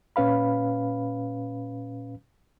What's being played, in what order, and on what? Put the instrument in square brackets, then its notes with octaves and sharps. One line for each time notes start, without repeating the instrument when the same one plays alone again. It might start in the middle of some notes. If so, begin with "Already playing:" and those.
[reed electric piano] A#2 C#4 B4 F5 B5